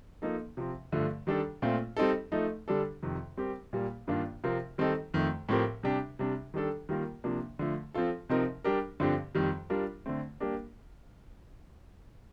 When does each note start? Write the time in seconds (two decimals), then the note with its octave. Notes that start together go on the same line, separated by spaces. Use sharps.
0.22 F3 A#3 D#4 A4
0.57 C3 F3 C4
0.92 G2 D3 F3 A3
1.27 D#3 G3 D4 A4
1.62 A#2 A3 C4 F4
1.97 G3 C4 D#4 A4
2.32 F3 A3 D#4 A4
2.68 D3 G3 D4 A4
3.02 F2 C3 D#3
3.37 G3 C4 G4 A#4
3.73 A#2 G3 A#3
4.07 G2 D#3 A#3 D4 F4
4.44 C3 F3 C4 F4 A#4
4.78 D#3 G3 C4 D#4 A4
5.14 F2 D#3 A3
5.49 A2 F3 C4 G4 A#4
5.83 C3 G3 D4 G4
6.19 C3 G3 D4
6.54 D#3 G3 D4 A4
6.89 D#3 G3 A#3 F4 A#4
7.24 C3 F3 A#3 D4
7.59 D3 F3 A3
7.94 F3 C4 F4 A4
8.29 C3 F3 C4 D#4 A#4
8.64 G3 D4 G4 A#4
9.00 G2 D3 F3 C4 G4
9.35 F2 D#3 G3
9.70 G3 D4 F4 A#4
10.06 D3 A3 C4
10.40 G3 A#3 D4 G4 A#4